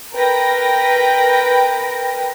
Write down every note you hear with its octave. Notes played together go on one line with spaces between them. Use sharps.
A#4 B4 G5 A#6